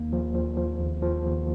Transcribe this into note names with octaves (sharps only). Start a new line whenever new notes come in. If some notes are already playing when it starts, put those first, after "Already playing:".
Already playing: D#2 A#3
F3
F3
F3
D#2
F3
D#2